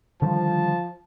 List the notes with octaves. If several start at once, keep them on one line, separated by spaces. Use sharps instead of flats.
D3 D#3 F3 G3 A5